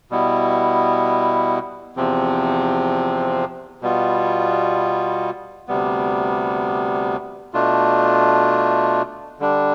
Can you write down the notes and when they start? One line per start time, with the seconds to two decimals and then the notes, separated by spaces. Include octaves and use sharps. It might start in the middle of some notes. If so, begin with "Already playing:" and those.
0.11 B2 G3 B3 E4
1.96 E2 C3 F3 C4
3.82 B2 G3 B3 F4
5.68 D2 C3 G3 B3
7.53 B2 A3 D4 F4
9.39 D3 G3 D4